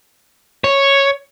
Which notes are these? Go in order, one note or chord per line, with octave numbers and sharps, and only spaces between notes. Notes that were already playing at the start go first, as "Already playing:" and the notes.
C#5